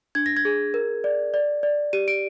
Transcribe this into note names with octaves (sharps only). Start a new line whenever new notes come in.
D4 G#6
A#6
G#6
G#4
A#4
D5
D5
D5
G4 D#7
D7